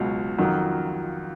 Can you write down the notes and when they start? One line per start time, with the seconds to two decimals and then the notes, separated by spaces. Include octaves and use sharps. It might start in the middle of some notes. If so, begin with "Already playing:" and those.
Already playing: C#2 B2 F#3
0.38 F2 D#3 F#3